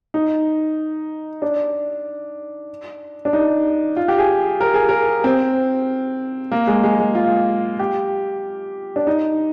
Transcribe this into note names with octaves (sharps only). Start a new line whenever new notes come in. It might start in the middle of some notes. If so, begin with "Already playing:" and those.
D#4
D4
D4
D#4
F4
G4
G#4
A#4
G#4
A#4
C4
A#3
G#3
G#3
G#3
F4
G4
D4
D#4